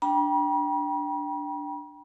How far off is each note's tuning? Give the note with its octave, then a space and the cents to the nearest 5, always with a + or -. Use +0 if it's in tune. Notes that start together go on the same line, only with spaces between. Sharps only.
D4 +0 G5 +0 B5 -45